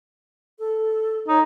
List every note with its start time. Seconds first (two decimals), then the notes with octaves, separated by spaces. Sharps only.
0.59 A4
1.28 D#4 C#5